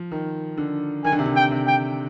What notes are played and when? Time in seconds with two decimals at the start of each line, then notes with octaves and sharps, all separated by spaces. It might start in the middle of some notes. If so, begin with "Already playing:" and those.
Already playing: F3
0.12 D#3
0.58 D3
1.04 D#3 G#5
1.12 D3
1.19 C3
1.26 D3
1.36 G5
1.51 C3
1.67 G5